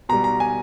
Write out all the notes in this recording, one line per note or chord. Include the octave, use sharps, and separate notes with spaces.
B2 G3 A#5
A#5
G#5